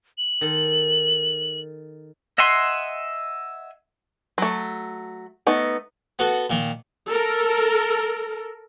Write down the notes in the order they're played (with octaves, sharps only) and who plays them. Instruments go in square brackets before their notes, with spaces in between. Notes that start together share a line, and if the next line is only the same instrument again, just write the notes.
[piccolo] F#7
[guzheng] D#3 A4 C6
[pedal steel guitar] D#5 E5 F#5 G#5 C6
[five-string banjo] F#3 A3
A3 B3 D#4
[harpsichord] B3 F#4 A4
A#2 D#3
[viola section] A4 A#4